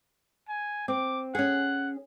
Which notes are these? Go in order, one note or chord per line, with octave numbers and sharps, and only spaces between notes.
G#5
C4 D6
C#4 G#4 F#5